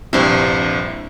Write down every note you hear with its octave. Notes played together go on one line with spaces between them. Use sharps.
A#1 G2 C3 E4 C5